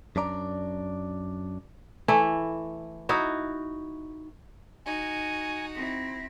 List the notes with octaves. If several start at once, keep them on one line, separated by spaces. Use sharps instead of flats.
F#2 D4 D5 A#5
E3 A3 E4
D#4 E4 F#4
D#4 F#4 G#5
C4 E4 A#6